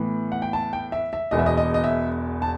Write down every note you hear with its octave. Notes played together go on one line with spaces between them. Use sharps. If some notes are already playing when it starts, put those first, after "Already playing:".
Already playing: A2 E3 B3 B5
F#5
G5
A5
G5
E5
E5
E1 E2 B2 D#5
E5
D#5
D#5
D#5
E5
A5